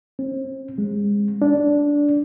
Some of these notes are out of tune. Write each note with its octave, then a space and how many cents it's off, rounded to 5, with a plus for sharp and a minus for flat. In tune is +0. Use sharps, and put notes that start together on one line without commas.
C4 +35
G#3 -25
D4 -10